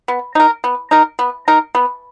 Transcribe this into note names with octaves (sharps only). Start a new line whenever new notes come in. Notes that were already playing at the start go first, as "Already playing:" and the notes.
B3
D#4 A#4
B3
D#4 A#4
B3
D#4 A#4
B3